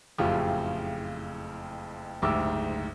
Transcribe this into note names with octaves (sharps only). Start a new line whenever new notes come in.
F#1 F2 A2 C#3 F4 G4
F#1 D2 G#2 G4 D6 E6